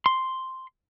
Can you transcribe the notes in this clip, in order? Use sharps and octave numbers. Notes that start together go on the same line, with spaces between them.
C6